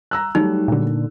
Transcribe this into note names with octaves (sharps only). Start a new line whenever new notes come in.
A#5 E6 F#6
F#3 G3 A3 D#4
A#2 D3